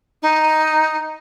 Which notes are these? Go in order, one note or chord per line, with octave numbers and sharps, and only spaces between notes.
D#4